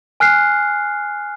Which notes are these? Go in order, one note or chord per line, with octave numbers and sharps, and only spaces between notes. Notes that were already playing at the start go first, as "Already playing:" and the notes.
G#5 F6 F#6 C7